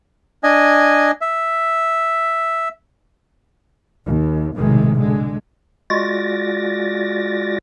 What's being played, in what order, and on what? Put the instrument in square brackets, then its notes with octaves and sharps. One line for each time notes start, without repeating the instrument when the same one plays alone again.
[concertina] D4 D#5 G#5
E5
[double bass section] D#2
B1 A2 C3 D#3 G#3
D3 G#3
[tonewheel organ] G#3 F4 F#4 D5 A6 A#6